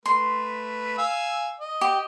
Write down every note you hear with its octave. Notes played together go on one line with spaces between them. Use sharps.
A3 B4 C6
F5 G#5 E6
D#5
G4